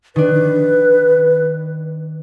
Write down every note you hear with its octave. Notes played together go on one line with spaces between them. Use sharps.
D#3 D4 B4